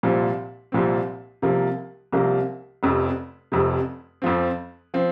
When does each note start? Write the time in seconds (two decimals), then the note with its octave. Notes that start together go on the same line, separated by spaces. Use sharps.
0.03 C2 A#2 F3 C4
0.72 C2 A#2 F3 C4
1.42 C2 C3 F3 A#3
2.12 C2 C3 F3 A#3
2.83 F1 F2 C3
3.52 F1 F2 C3
4.22 F2 F3 C4
4.94 F3 C4